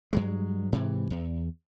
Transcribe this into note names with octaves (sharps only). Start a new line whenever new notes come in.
G2 F#3 G#3
G#2 C3 E3
E2